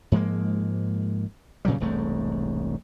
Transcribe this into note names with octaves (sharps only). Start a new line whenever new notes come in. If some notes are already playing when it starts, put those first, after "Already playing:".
G#2 F3 G#3 A#3
A#2 C#3 F#3 G3
E1 C2 G#2 A3